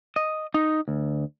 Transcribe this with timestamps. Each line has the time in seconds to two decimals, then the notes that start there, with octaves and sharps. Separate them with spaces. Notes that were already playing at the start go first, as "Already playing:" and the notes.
0.16 D#5
0.54 D#4
0.88 D2